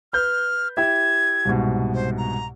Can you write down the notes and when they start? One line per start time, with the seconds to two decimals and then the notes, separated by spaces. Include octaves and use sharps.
0.13 B4 F6 G6
0.77 E4 G4 E5 G#6
1.45 C2 G#2 B2
1.94 C5
2.17 A#5